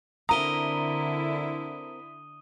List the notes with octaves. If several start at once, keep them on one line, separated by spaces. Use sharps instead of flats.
D3 C4 E4 A#4 A#5 D#6 D#7 G7